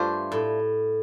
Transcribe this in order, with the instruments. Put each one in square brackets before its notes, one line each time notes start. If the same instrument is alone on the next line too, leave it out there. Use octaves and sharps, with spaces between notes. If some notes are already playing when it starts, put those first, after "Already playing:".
Already playing: [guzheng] G2 [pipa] A3 D4 F4 C5
[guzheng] A2